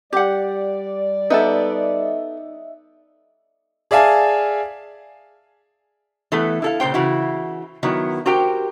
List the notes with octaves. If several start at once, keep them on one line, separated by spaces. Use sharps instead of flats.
G3 G4 D5 F#5
B3 D#4 A4 D#5 E5
G#4 D5 E5 F5 G#5 A5
E3 A3 B3 A4
E4 A4 F5
A#2 C#3 C5 G5
C#3 E3 E4 F#4
D#3 F#3 B3 E4
F#4 G4 A#4 C5 G5